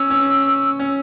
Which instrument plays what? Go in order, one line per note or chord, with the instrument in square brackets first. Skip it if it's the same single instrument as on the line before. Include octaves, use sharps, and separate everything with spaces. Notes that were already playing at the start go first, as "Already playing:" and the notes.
Already playing: [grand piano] C#4 [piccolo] E6
[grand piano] C#4
C#4